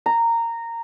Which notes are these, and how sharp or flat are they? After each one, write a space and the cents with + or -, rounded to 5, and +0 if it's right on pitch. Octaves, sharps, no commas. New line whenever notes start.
A#5 -15